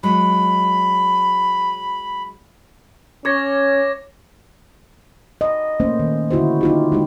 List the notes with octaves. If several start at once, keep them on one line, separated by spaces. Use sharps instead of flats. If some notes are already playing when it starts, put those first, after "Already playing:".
F#3 G#3 B5
C#4 C#5 D6 G#6 A#6
D#5
A3 A#3 C#4 C5
D#3
D3 E4 F#4 C5
D#4 F4 G4
G#3 D#4 G4